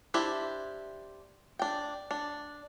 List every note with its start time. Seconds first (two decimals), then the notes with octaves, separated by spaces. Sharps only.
0.14 D4 E4 G4 C5 E5
1.59 D4 G5
2.11 D4